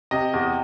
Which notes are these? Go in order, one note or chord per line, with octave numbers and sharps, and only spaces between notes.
C3 D#5
E2